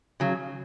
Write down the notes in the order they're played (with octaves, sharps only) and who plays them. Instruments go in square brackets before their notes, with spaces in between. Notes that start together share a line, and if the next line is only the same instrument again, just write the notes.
[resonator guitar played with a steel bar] C#3 F#3